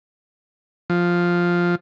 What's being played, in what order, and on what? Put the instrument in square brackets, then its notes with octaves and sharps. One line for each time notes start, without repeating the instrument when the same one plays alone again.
[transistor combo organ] F3